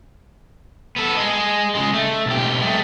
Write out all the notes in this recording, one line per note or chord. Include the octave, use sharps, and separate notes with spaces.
B3 A4
G#4 D#5
C#3 G#3
A3
B1 G4
G#3 A3